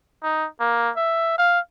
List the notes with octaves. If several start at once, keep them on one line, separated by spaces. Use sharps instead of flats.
D#4
A#3
E5
F5